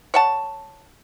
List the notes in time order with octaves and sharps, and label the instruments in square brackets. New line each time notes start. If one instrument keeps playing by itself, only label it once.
[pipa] C#5 F#5 A5